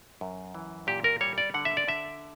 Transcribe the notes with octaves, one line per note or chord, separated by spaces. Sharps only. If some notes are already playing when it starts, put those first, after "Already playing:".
F#2
E3
A#2 G4
A#4
G3 C#5
D5
D3 F#5
E5
D5
D3 E5